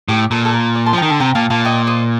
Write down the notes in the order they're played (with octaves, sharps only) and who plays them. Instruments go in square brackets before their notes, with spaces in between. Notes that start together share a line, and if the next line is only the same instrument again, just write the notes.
[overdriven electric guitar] A2 [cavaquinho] G4
[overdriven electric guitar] A#2 [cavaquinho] A4
[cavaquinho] A4
A#4
D5
A5 C6
[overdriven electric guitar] F3
[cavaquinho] G5 A#5
[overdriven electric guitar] D#3
[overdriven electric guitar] D3 [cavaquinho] A5 C6
[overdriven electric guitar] C3 [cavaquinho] G5 A#5
[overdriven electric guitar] A#2 [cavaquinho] F5 A5
[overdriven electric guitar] A#2 [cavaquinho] F5 A5
[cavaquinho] D#5 G5
C5 D#5